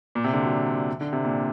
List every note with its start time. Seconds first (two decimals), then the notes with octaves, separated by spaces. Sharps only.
0.15 A#2
0.24 C3
0.33 D3
0.43 F#3
1.01 D3
1.13 C3
1.25 A#2